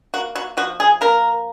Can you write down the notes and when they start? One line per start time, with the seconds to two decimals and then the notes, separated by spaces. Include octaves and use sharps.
0.14 A#3 F#4
0.35 F#4
0.57 F3 F#4
0.80 G#4
1.01 A#3 A#4